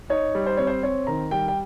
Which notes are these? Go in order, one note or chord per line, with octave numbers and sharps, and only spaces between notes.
D#4 C#5
G3
C5
C4 C#5
C5
C4 C#5
D#3 A#5
G3 G5
G5